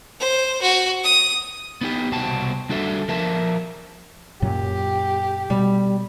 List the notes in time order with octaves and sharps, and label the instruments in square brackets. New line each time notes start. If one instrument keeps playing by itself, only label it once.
[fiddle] C5
F#4
D#6
[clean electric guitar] B3 D#4 G4
C2 B2 C4 F#4 A5
G3 D4 F#4 A4 E5
F3 A#4 E5 A5
[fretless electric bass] F#2 A#2 F#3 [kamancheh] G4
[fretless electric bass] B2 [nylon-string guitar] G3